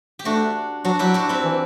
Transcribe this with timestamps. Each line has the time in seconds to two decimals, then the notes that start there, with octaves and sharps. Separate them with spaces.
0.19 G4
0.25 A3 D4 F#4
0.84 F#3 D4 F#4
0.99 F#3 E4 G4
1.14 D4 F#4
1.29 C4 E4
1.44 E3